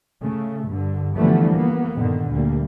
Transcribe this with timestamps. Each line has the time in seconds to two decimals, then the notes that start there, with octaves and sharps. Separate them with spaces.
0.22 C#3 A3
0.66 G2 D3
1.14 D3 E3 F3 G3 A3 B3
1.52 A#3 B3
1.94 G2 A#2 D3 D#3
2.30 D2 G3 A#3